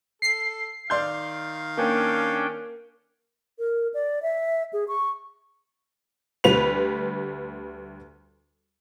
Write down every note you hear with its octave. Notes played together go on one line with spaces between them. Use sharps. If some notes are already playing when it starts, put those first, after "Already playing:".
A4 C7
D#3 D5 F5 C6 G6
A#3 C#4 D4 G5
A#4
D5
E5
G#4
C#6
D2 G3 B4 F7